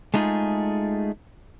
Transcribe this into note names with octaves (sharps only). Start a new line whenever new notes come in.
G#3 A3 D#4 F4 G#4